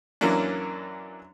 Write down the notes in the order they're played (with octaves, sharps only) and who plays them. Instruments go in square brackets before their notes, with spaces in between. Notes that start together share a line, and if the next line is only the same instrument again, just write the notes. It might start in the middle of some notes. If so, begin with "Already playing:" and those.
[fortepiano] F#2 E3 F#3 A#3 C#4 D4